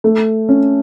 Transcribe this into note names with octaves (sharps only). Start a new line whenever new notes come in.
A3
C#4